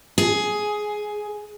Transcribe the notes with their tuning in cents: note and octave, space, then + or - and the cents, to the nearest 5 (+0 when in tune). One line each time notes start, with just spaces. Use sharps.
G#4 +10